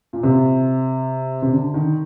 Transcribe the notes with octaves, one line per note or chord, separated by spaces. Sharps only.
A#2
C3
C3
D3
D#3